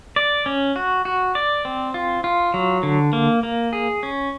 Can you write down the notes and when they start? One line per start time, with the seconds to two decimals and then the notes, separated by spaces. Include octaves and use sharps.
0.16 D5
0.46 C#4
0.76 F#4
1.05 F#4
1.35 D5
1.65 C4
1.94 F4
2.24 F4
2.54 F#3
2.83 D3
3.13 A#3
3.43 A#3
3.73 G#4
4.03 C#4